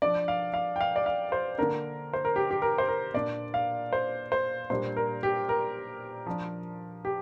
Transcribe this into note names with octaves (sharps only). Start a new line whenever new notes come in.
F3 D4 D5
F5
F5
G5
F5
D5
F5
C5
D3 A#3 D4 A#4
C5
A#4
G4
G4
A#4
C5
A#4
A#2 A#3 D4 D5
F5
C5
C5
A#2 G3 D4 C5
A#4
G4
A#4
F3 D4
G4